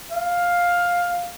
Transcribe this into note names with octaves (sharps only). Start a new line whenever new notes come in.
F5